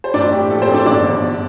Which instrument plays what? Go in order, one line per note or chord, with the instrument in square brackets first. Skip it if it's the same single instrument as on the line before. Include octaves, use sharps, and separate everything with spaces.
[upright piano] C5
A2 D4 D5
A2 G4
A#1 A4
C4 C5
A#1
D4 D5
G1 D4 D5
G1
G1